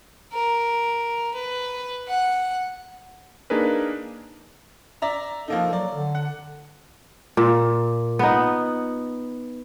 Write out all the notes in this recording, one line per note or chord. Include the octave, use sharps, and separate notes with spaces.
A#4
B4
F#5
A#3 D4 D#4 G#4 A#4 B4
D5 E5 A#5
F3 A#3 D#4 A4
F#3 D5
D3
F#5
A#2
B3 D#4